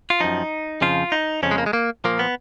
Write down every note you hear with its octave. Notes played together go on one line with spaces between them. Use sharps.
F4
F#2 F3 D#4
F2 C#3 F3 F4
D#4
F2 C#3 F3 C#4
G#3
A#3
G#3
A#3
A#2 F3 A#3
B3